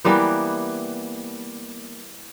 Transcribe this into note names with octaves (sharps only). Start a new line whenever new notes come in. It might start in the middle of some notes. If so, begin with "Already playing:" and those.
E3 G3 A#3 B3